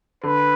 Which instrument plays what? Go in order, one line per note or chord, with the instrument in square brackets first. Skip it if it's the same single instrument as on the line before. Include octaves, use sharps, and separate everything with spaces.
[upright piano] D3 [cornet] B4